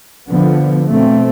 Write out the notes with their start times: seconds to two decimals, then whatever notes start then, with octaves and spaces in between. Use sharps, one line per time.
0.31 D3 F3 B3
0.88 B2 A3 C4